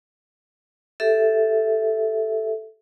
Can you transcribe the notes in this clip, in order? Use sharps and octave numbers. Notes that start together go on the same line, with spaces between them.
G4 A4 E5